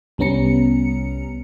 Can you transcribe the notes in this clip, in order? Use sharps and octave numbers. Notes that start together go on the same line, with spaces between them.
C2 G3 B3 C#4 A#5 C#7